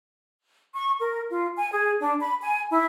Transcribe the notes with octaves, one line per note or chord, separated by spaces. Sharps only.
C#6
A#4
F4
G#5
G#4
D4
B5
G#5
E4